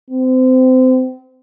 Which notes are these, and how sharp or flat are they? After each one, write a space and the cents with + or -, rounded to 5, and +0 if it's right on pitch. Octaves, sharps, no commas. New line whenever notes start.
C4 -30